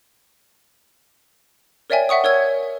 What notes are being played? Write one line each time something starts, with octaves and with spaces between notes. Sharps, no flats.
A#4 C#5 D5 E5 G5 G#5
E5 F#5 C#6 D#6
A#4 C#5 E6 G#6